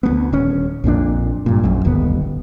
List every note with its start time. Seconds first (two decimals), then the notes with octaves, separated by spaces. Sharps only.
0.03 D2 A3 B3
0.33 D#1 C#4
0.84 A#1 F2 A#2 D4
1.46 G2 A#2
1.64 A#1 F#2
1.85 D1 G1 D#2 B3